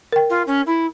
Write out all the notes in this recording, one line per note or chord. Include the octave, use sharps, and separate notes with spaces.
A#4 G5
F4
C#4
E4